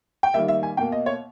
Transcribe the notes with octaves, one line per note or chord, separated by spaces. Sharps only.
G5
D#3 G3 A#3 E5
E5
G#5
B2 A#3 G5
D#5
C#5